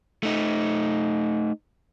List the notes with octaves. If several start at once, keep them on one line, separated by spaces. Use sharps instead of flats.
A3 D#4